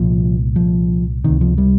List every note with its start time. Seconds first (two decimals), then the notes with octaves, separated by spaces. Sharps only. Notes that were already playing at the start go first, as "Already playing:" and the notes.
Already playing: C2 A#2 F3
0.56 F3
1.25 C#2 C3 D#3
1.41 F3
1.58 G3